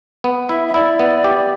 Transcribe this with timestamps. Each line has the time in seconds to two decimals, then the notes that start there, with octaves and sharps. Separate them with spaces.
0.24 B3
0.49 E4 E5
0.68 E5
0.74 E4 D5
0.99 B3
1.24 G4